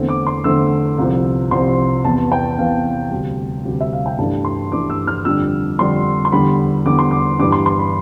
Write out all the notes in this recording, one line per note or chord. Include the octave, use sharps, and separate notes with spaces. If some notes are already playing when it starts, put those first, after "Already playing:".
Already playing: E2 D3 A3 C4
D6
C6
E2 D3 A3 C4 E6
C2 C3 F3 C4
C2 C3 F3 C4 C6
E2 C3 E3 B3 A5
G5
E2 C3 E3 B3 F5
D2 C3 G3
D2 C3 G3
E5
F5
G5
G2 E3 A3 D4 A5
C6
G2 E3 A3 D4 D6
E6
F6
F2 D3 G3 D4 E6
F2 D3 G3 D4 C6
C6
E2 D3 G3 B5
E2 D3 G3 D6
C6
D6
G2 E3 G3 D4 D6
C6
C6
B5